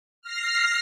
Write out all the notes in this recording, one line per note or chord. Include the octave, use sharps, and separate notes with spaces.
F6 A#6 C7